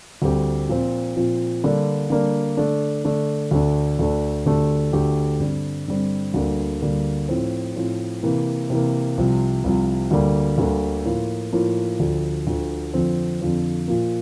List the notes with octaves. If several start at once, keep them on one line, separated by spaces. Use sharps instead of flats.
D2 D3 G3 C4 G4
A#2 F3 C4
A#2 F3 C4
D3 G3 A#3 D4
D3 G3 A#3 D4
D3 A3 D4
D3 A3 D4
D2 D3 A3 D4
D2 D3 A3 D4
D2 D3 A3 D4 G4
D2 D3 A3 D4 G4
G2 D3 G3 C4
G2 D3 G3 C4
D2 D3 G3 A#3
D2 D3 G3 A#3
A2 F3 C4
A2 F3 C4
C3 E3 A#3
C3 E3 A#3
C2 C3 F3
C2 C3 F3
D2 D3 G3 A#3
D2 D3 G3 A#3
A2 F3 A#3 F4
A2 F3 A#3 F4
D2 D3 F3
D2 D3 F3
F2 D3 F3 C4
F2 D3 F3 C4
A#2 F3 A#3